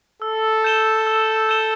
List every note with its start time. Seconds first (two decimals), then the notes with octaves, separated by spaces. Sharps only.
0.22 A4 E6
0.64 G6 E7 G7
1.07 E6
1.49 G6 E7 G7